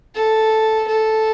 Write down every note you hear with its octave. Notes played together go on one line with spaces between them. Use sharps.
A4
A4